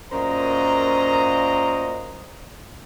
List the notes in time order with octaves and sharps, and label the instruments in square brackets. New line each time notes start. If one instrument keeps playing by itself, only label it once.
[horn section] F#2 A#2 C5 D#5 A#5